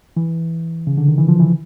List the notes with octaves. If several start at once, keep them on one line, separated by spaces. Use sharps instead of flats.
E3
C#3
D3
D#3
E3
F3
E3